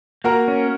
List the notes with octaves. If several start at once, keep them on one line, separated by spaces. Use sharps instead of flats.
A#3 F#4 A#4
C#4